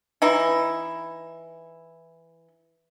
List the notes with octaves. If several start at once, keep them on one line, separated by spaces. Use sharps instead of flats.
E3 D#4 E4